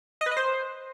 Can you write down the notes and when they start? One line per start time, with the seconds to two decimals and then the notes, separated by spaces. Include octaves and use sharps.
0.21 D#5
0.26 B4
0.31 D#5
0.37 C5